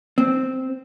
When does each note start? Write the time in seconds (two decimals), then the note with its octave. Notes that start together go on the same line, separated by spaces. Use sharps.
0.18 C4